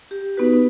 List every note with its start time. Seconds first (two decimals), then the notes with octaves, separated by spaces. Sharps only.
0.11 G4
0.37 B3 D#4 F#4 B4